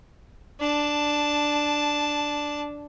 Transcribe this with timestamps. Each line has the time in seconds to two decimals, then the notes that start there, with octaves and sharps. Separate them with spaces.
0.60 D4 A5